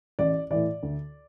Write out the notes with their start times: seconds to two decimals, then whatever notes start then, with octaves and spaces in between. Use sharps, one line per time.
0.19 A1 D5
0.51 A2 E3 D5
0.83 D2